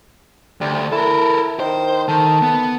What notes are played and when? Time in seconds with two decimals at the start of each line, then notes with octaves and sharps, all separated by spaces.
0.61 D2 G3
0.92 E4 A4 A#4
1.60 D#3 C5
2.08 D#3 A4
2.42 B3